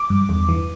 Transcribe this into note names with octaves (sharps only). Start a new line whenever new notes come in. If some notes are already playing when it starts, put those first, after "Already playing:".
Already playing: D6
G2
E2
E3